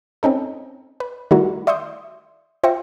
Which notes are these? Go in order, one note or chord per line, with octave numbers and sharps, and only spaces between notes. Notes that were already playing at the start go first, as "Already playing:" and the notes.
C4 C#4 D#4 A4
B4
D#3 G3 A3 E4 F#4 A#4
D5 E5 C6 C#6 D#6 G6
F4 C5 E5 G5 C#6 A#6